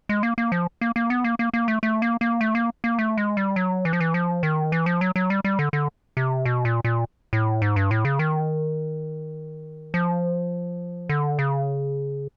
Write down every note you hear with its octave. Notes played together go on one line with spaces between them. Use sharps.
G#3
A#3
A#3
F3
A#3
A#3
B3
A#3
A#3
A#3
A3
A3
A#3
A#3
A3
A#3
A#3
A3
G#3
G3
F#3
E3
F3
E3
F3
D#3
E3
F3
F#3
F#3
G3
G3
D3
D3
C3
B2
A#2
A#2
A2
G#2
G2
A2
C#3
D#3
F3
D3
C#3